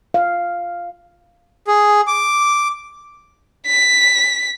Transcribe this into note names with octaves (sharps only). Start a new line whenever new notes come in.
F5
G#4
D6
B6